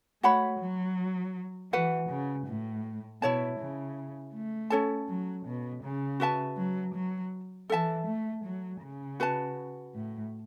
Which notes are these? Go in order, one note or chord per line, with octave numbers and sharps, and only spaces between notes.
A3 F#4 C#5 F#5 B5
F#3
E3 F#4 B4 F#5
C#3
A2
B2 E4 C#5 A5
C#3
A3
C#4 A4 C#5 A5
F#3
B2
C#3
F#4 B4 E5 A5
F#3
F#3
E3 A4 E5 A5
A3
F#3
C#3
F#4 B4 A5
A2